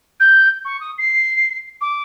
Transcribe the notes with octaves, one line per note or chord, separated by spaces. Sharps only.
G6
C#6
D#6
C7
D6